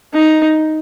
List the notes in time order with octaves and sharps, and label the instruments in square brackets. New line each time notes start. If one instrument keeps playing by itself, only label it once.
[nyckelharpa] D#4